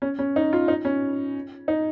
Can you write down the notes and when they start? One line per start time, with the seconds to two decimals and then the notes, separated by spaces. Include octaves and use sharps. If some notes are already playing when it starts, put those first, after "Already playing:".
0.02 C#4
0.19 C#4
0.36 D#4
0.53 F4
0.68 D#4
0.85 C#4
1.68 D#4